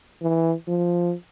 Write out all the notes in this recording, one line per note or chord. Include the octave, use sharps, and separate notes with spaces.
E3
F3